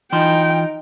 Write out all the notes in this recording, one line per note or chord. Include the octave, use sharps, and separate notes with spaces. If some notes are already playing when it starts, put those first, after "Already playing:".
E3 D#4 F4 G5 C6